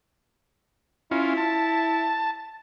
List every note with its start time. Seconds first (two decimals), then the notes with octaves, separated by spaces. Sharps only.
1.11 C#4 E4 F4
1.37 A5